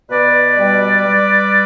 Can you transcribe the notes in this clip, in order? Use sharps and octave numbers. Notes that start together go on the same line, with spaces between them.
B2 B4 D5
G3
G3